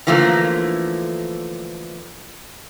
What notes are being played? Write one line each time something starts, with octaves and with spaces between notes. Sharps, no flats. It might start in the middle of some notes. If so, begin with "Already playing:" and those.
D3 E3 F3 A3 A#3